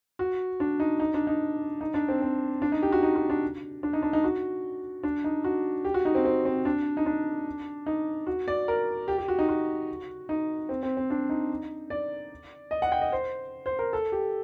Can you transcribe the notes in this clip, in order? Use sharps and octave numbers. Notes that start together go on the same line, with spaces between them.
F#4
D4
D#4
D#4
D4
D#4
D#4
D4
C4
C4
D4
D#4
G4
F#4
D#4
F#4
D4
D4
D#4
D4
D#4
F#4
D4
D#4
F#4
G4
F#4
D#4
C4
C4
C4
D4
D#4
D4
D#4
F#4
D5
A#4
G4
G4
F#4
D#4
F#4
D#4
C4
C4
C4
D4
D#4
D5
D#5
F#5
G5
D#5
C5
C5
A#4
A4
G4